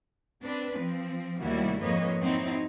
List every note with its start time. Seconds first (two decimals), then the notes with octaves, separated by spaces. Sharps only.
0.41 C4 D4 B4
0.74 F3 C4
1.39 D#2 C3 G3 A3 E4 F#4
1.82 F2 G#2 A#3 B4 C#5 D#5
2.21 F#3 C4 D#4 E4